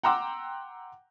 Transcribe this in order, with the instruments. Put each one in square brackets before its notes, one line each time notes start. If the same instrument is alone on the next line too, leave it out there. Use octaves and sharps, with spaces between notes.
[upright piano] F#5 G5 A#5 C6 D6 E6